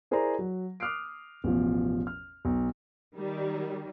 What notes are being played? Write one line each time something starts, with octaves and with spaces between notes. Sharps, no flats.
E4 G#4 A#4 C5 D5 A#5
F#3
D6 D#6 F6 F#6 C7 D7
A1 E2 B2 F3
F6
B1
D#3 G3